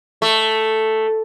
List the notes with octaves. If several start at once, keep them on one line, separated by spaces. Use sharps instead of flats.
A3